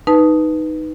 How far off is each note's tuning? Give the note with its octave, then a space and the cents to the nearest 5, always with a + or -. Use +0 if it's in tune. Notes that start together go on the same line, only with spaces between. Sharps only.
D#4 +0 B4 +0 A5 -10